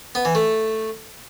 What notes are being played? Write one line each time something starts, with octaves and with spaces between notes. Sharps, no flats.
B3
E3
A3